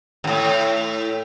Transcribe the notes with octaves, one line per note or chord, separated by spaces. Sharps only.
D#2 A2